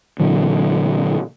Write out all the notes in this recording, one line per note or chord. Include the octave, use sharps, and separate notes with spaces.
A#2 D3 E3 F#3